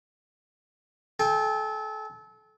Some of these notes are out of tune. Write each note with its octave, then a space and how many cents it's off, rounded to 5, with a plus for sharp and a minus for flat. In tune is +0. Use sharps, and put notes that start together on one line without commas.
A4 -30 G5 +35